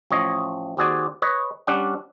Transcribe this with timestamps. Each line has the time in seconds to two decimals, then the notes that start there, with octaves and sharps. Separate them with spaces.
0.11 A1 F3 C#5 D#5
0.77 D#2 C4 F#4 G#4 D5 G#5
1.22 B4 C#5 D#5
1.67 G3 C#4 D4 F#5